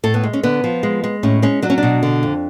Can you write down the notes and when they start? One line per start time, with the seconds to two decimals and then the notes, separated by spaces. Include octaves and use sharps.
0.04 A2 A4
0.14 B3
0.23 G#3
0.33 C#4
0.43 D3 B3
0.64 F3
0.83 G#3
1.04 G#3
1.23 A2 C#4
1.42 G#3 C#4
1.62 F#3 D4
1.70 C#4
1.78 B2 D4
2.03 D3
2.23 F2